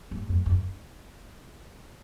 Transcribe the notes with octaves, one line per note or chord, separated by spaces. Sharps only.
G2
F#2
F#2